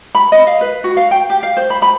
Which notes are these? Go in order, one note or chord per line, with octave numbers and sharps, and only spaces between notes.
B5
D#5
F5
B4
F#4
F5
G5
G4
F5
C5
B5
B5